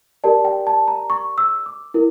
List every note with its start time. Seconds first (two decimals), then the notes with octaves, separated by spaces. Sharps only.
0.24 G4 A#4 D5 A5
0.45 G5
0.67 A5
0.88 A#5
1.10 C#6
1.38 E6
1.66 D6
1.94 E4 A#4